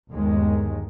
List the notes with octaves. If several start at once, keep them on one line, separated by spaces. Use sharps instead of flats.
G1 D#2 D#3 G#3